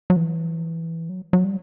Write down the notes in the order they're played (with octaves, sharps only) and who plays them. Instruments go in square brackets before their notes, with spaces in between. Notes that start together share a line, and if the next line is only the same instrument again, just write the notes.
[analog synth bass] F#3
E3
F#3
F#3
G3